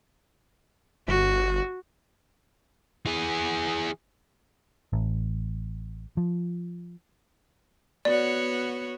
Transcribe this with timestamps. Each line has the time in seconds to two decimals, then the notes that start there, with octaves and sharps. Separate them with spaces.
1.08 G1 F#4
3.06 E3 G#4
4.93 A1
6.17 F3
8.05 B3 F#4 C#5 D5